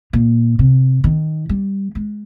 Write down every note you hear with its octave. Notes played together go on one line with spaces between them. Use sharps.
A#2
C3
D#3
G3
G#3